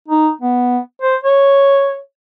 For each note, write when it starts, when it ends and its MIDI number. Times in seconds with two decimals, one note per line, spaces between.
0.08 0.30 63
0.41 0.79 59
1.02 1.16 72
1.23 1.99 73